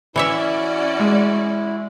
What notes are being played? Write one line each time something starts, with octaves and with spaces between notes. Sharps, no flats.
E3 C#4 E4 F#4 C#5 D5 E5
G#3